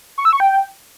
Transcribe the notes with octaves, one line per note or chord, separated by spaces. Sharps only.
C#6
E6
C#6
G5